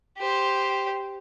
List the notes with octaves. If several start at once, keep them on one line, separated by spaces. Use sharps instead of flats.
G4 C5